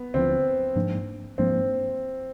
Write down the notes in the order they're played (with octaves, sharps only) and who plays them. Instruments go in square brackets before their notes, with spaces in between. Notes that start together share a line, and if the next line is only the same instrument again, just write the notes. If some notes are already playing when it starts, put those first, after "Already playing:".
Already playing: [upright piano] B3
[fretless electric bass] D2 D3 F3 [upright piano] C4
[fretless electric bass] G#2 F3 A#3 D4
[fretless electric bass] G#2 F3 A#3 D4 [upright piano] C4